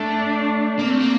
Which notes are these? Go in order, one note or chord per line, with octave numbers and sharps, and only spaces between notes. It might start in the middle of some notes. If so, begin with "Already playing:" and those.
Already playing: A3 D4
A#3 C4
A3
A#3